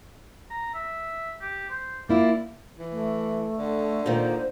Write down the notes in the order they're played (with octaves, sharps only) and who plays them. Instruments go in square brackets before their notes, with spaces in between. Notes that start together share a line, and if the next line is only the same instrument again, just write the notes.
[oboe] A#5
E5
G4
C5
[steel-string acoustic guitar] A#3 E4 F4 [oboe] D5
[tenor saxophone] E3
[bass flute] A3
[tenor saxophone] D3
[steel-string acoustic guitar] A#2 D#3 [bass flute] C5